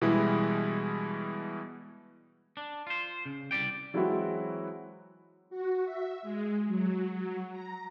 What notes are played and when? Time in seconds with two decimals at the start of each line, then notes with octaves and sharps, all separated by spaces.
0.01 B2 E3 G3 G#3 E4
2.57 D4
2.87 F4 C5
3.26 C#3
3.51 C2 D5 G5
3.94 E3 F#3 G#3 C4 E4 F#4
5.50 F#4
5.84 E5
6.23 G#3
6.67 F#3
7.12 F#3
7.51 A#5